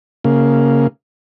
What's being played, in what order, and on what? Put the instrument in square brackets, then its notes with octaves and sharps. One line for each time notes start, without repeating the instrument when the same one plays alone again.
[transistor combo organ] C#3 A#3